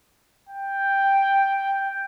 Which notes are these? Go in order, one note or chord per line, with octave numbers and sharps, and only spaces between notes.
G5